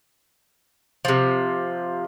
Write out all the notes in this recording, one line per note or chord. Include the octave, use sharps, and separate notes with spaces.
C3 F3